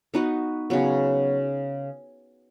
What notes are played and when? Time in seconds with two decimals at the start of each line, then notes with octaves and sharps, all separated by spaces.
0.14 B3 D#4 F#4 B4
0.70 C#3 F#3 B3